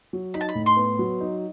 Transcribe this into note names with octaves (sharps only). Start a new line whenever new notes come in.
F#3
D#4 B5
A5
B5
A2
C6
B3
F#3
D#4